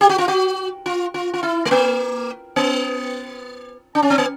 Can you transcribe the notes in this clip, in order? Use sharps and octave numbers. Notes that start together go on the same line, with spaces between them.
G4
F#4
F4
F#4
F4
F4
F4
E4
A3
A#3
B3
D4
C#4
C4
B3